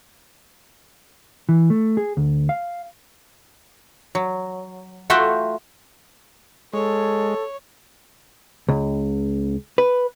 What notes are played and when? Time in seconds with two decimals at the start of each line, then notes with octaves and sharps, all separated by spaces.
1.49 E3
1.70 A3
1.97 G#4
2.17 D2
2.49 F5
4.15 F#3
5.10 A3 F4 F#4 E5 F#5 G5
6.73 G#3 A4 C#5
8.69 C#2
9.78 B4